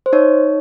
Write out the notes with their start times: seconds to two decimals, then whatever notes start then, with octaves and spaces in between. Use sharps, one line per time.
0.06 C5
0.13 D#4 C#5